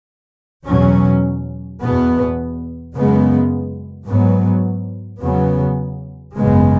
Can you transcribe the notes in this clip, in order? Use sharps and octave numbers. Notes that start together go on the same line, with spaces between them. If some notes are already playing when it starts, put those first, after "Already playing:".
E2 B2 F#3 C#4
E2 B2 B3
F#2 C#3 G#3 B3
G#2 F#3 B3
E2 C#3 F#3 B3
G#1 F#2 C#3 G#3 B3